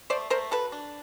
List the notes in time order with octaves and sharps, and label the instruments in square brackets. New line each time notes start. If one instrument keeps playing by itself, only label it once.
[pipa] A3 C5 D5
A3 A#4 C5
F#3 A4 B4
D4